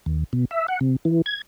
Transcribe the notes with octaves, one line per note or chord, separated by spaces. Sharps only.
D#2
B2
E5
F#5
C3
E3
G#6